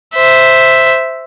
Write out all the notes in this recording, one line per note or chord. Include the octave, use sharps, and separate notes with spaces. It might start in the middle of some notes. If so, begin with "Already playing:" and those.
C5 E5